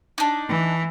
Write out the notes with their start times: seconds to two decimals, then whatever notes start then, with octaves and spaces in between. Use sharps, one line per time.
0.18 D4 D#4
0.48 E3